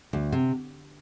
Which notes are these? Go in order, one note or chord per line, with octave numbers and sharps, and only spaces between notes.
D2
C3